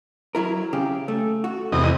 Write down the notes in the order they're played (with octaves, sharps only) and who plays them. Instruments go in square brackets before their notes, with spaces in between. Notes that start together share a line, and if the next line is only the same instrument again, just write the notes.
[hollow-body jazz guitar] F#3 E4 A#4
C#3 G4
A3
F#4
[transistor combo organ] E2 C3 D#5